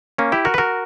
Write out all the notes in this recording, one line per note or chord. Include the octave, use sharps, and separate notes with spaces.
A#3 C#4
E4 G4
F#4 A#4
B4
F#4 A#4